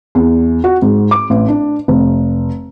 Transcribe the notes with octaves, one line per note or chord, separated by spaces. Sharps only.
E2
F#4
G#2
D6
A1
D4
F1